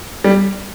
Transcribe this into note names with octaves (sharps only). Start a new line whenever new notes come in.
G3